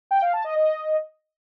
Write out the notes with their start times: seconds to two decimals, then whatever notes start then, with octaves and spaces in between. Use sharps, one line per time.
0.11 G5
0.22 F5
0.33 A5
0.44 D#5
0.56 D#5